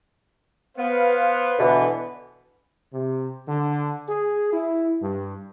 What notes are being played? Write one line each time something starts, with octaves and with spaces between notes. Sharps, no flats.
B3 B4 C5 F5
B2 D3 E3 B3
C3
D3
G#4
E4
G2